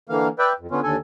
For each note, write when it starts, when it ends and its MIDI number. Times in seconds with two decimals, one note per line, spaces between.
0.09 0.28 50
0.09 0.28 52
0.09 0.28 58
0.09 0.28 77
0.39 0.53 71
0.39 0.53 74
0.39 0.53 76
0.39 0.53 79
0.59 0.67 41
0.71 0.80 50
0.71 0.80 59
0.71 0.80 61
0.71 0.80 65
0.83 0.96 39
0.83 0.96 50
0.83 0.96 69
0.83 0.96 80